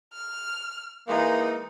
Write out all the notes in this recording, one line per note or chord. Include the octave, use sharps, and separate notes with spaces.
F6
E3 G#3 A#3 D#4